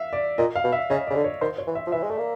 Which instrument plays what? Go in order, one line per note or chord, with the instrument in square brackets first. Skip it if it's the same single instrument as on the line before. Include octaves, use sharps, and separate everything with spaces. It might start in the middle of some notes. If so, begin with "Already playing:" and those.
Already playing: [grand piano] E5 F5
D5
[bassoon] A#2 [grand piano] D#5
[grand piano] F5
[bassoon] B2
[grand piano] E5
[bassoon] C#3 [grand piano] D#5
[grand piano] D5
[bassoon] C#3
D3
[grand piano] C#5
[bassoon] D#3 [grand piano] C5
[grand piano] C#5
[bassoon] E3
[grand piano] E5
[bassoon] F3
[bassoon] E3 [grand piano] E5
[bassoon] G#3
[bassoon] A3 [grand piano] D5
[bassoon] A#3